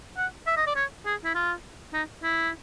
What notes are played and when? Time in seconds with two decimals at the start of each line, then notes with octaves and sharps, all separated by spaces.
0.17 F#5
0.47 E5
0.57 D#5
0.66 D5
0.76 C#5
1.06 G#4
1.24 E4
1.35 F4
1.93 D#4
2.23 E4